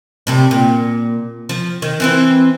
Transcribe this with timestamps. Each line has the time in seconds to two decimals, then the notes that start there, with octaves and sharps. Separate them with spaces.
0.27 A2 C3 G3
0.51 A#2
1.49 F3
1.82 D#3
2.00 E3 C4 E4